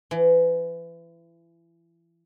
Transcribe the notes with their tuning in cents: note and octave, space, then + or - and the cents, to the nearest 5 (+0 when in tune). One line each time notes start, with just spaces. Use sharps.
E3 +30